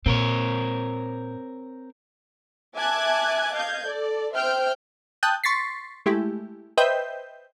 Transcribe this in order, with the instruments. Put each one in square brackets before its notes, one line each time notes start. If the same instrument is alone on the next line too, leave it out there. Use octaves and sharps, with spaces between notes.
[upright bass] A#2 [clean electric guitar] C4 A#4 C#5
[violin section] E5 G#5 A5 D6 F#6 G#6
D#5 F5 G6 G#6
A4 D5
C5 E5 G5 F6 G6
[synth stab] G5 A5 D#6 F#6 G6
C6 C#6 A6 B6 C7
G#3 A3 E4 G4
B4 C5 D#5 E5 G5 G6